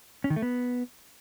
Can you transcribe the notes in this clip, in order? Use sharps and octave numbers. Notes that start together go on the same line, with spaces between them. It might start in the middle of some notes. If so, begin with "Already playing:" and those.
C#4
D#3
A3
B3